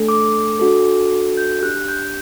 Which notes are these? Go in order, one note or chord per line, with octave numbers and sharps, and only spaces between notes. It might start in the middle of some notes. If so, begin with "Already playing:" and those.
Already playing: A3 D4 A4
D6
D4 F#4 A4
G6
D4 G4 F#6
G6